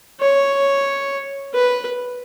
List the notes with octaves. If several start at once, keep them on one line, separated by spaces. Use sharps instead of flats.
C#5
B4